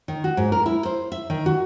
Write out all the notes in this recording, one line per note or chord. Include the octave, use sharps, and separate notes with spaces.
D#3
F#4
G#2
A#4
E4
C5
E5
D#3
F#4